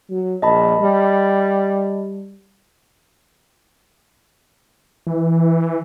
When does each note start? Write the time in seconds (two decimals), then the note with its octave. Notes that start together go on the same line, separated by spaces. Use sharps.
0.10 F#3
0.42 A#1 D#5 A5 B5
0.80 G3
5.07 E3